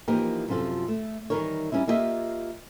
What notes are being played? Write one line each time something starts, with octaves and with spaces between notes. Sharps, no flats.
E3 F3 A#3 D#4 G4 A#4
F#2 C3 F3 F4 A4
A3
D#3 E3 G3 D#4 A#4 C#5
G3 C#4 D#4 E4
A#3 E4 F4 G4 D#5 E5